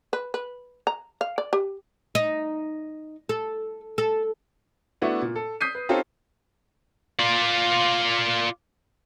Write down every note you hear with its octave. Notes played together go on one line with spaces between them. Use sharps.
B4
B4
A#5
F5
D5
G4
D#4
A4
A4
A3 B3 D4 E4 F#4
A#2
A4
D#6 G6 B6 C7 D#7
B4
C4 C#4 D#4 F4 G4 A4
F4 D5